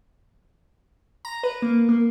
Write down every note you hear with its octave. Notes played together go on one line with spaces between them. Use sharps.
A#5
B4
A#3
A#3